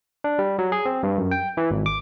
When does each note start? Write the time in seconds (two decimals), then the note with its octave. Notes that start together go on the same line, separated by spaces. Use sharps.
0.24 D4
0.39 G3
0.59 F#3
0.72 G#4
0.85 C4
1.03 G2
1.18 F#2
1.31 G5
1.57 E3
1.71 G#1
1.86 D6